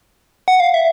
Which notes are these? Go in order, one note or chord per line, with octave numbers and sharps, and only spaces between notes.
F#5
F5
E5